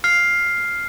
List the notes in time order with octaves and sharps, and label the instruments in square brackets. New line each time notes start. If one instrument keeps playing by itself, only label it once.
[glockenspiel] F6 C7